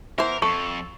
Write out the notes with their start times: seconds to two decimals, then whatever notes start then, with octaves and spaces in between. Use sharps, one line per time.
0.18 E3 B3 A#4 C5
0.42 F2 A4 C#6